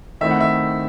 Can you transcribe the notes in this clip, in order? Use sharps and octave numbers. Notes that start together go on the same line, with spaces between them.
D#3 A3 C4 E4 E5
F#5
E5